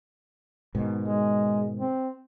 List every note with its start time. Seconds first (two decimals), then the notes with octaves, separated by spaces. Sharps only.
0.75 G#2 B2 D#3
1.07 G#3
1.80 C4